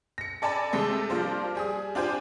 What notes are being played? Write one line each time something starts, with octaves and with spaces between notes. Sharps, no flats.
A#6 C#7
A4 D5 G#5 A5 B5
C3 G#3 A3 A4
F3 G3 A#3 D4 C5
G3 G#4 D#6
D4 F4 G4 C5 G#5